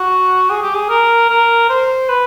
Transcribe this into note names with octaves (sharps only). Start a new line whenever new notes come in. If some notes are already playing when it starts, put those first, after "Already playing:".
Already playing: F#4
G#4
G4
G#4
A#4
A#4
C5
B4